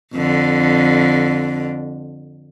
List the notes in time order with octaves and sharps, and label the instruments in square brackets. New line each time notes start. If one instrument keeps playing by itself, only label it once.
[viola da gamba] F2 D3